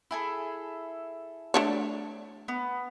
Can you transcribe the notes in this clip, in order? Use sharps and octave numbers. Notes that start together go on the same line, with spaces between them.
E4 G#4 A4
A3 D4 C#5
B3